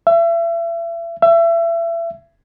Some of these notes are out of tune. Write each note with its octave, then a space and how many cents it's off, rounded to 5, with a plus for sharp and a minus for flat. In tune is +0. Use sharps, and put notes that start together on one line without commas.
E5 +35
E5 +30